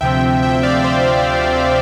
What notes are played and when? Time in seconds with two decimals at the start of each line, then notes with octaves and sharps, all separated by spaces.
0.01 D2 C3 F3 C4 E5 G5
0.42 E5 G5
0.63 D5 F5
0.84 C5 E5